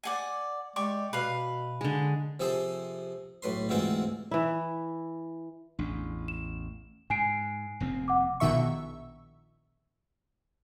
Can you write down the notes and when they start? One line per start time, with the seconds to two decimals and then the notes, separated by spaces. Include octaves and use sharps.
0.03 D5 F#5 G#5
0.76 G#3 G4 D5 C#6
1.13 B2 B4 F5
1.81 D3 G#3
2.40 C3 F3 G#4 A4 C5
3.42 B1 A2 B4 C6
3.69 D2 G#2 E3 C4 F4 C5
4.31 E3 E4
5.79 A1 E2 D4
6.28 E7
7.10 G#2 G#5 C7 D7
7.80 F1 D#2 C4
8.08 F#5 D6
8.40 A#1 B2 D#3 E5 C#6